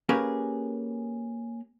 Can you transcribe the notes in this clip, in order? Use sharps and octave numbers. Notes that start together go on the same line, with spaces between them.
A#3 C#4 G4 G#4 A#4 B4